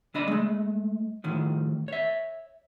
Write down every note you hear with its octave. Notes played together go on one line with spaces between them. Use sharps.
C#3 D4 D#5 B5
G#3 A3
A2 D#3 F3
C#5 E5